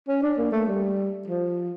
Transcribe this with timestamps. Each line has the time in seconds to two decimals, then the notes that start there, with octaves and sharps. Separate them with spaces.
0.08 C#4
0.23 D4
0.38 A#3
0.52 A3
0.68 G3
1.28 F3